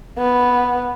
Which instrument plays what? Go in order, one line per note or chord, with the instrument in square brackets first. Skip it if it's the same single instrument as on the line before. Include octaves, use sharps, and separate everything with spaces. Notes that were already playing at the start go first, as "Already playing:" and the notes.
[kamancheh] B3